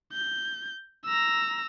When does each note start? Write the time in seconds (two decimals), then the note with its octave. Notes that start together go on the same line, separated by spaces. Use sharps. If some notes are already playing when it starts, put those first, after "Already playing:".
0.13 G6
1.05 A#5 E6